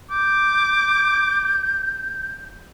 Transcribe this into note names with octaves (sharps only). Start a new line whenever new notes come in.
D6 G6